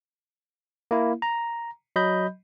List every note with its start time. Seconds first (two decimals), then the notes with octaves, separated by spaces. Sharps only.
0.91 A#3 E4
1.22 A#5
1.96 F#3 D#5 B5 G6